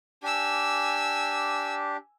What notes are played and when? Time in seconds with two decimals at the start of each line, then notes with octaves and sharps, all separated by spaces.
0.23 D4 G4 G#5 E6